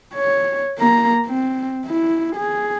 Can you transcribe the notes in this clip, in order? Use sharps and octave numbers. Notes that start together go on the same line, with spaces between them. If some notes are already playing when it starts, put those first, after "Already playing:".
C#5
A#3 A#5
C4
E4
G#4